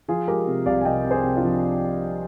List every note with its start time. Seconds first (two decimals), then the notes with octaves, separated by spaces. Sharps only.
0.08 F3 F4 G#4
0.28 G#3 G4 A#4
0.47 C3
0.66 C2 D5 F5
0.81 G#5
0.85 C3 D#5 G5
1.05 C3
1.11 G#4 C5
1.24 C3
1.37 D4 F4
1.43 F3